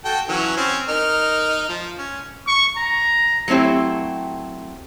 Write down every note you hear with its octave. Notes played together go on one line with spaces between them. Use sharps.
F#4 A4 G5
E3 F#3 C#4
C4 C#4
D#4 A#4 F6
F3
C#4
C#6
A#5
F#3 A3 C4 E4 G4